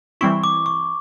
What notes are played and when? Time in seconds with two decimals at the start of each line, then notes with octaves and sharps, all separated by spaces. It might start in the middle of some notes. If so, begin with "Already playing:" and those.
0.21 E3 G3 C4 E4 C#6
0.44 D6
0.66 C#6